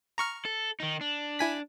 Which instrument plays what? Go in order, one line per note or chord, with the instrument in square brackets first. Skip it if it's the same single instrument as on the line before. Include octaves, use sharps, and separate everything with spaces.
[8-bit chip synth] A#5 C#6 F6
[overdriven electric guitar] A4
D#3 D#4
D4
[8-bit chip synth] E4 G#5 B6